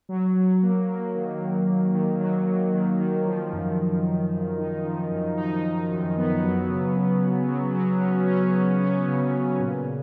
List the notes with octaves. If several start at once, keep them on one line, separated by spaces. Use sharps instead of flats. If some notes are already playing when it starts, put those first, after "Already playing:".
F#3
F#3
A#3
A#3
D#3
D#3
F#3
D#3
F#3
F#3
D#3
D#3
F3
F#2
F3
F#2
F#2
D#4
F3
F#2
D#4
D#4
F#2
B3
F#3
C#3
C#4
F#3
F#3
F#3
C#4
C#4
F#3
C#4
C#3
C#3
A#2
A#2